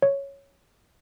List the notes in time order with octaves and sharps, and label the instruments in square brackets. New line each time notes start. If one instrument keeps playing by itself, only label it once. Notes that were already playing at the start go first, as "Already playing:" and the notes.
[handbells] C#5